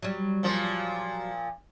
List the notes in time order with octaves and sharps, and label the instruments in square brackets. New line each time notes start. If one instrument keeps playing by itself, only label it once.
[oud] F#3 G3
[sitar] A#2 F3